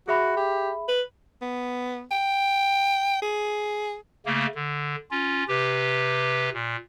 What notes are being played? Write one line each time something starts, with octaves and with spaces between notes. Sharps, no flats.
F#4 G#4 E5 B5
G4
B4
B3
G5
G#4
C#3 A3 A#3
D3
C#4 F4
C3 G4 B4
A#2